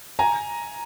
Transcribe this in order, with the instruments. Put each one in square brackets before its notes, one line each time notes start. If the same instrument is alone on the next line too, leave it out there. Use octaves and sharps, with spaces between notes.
[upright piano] G#5 A#5